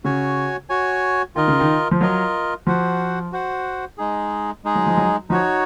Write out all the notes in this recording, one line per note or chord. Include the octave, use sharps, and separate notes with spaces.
C#3 F#4 C#5 G#5
F#4 C#5 G#5
D#3 F4 A#4 D#5
C#3
D#3
F3
F#3 F4 A#4 D#5
F3 F#4 C5 F#5
F#4 C5 F#5
G#3 D#4 G#4
G#3 D#4 G#4
F#3
F3
F#3
F3 D#4 F#4 C#5